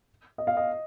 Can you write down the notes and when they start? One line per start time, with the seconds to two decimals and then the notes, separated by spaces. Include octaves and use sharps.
0.38 D#5
0.47 F5
0.57 D#5